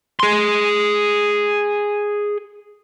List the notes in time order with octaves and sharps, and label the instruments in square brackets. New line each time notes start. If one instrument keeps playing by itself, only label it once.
[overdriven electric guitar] G#4 C6